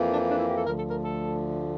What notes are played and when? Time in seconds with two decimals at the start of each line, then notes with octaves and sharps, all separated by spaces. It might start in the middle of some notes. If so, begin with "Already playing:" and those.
Already playing: F2 E3 A#3
0.12 D4
0.29 D4
0.38 E4
0.47 G4
0.56 A4
0.66 D2 D3 F3 A3 A#4
0.78 A4
0.90 A#4
1.03 A4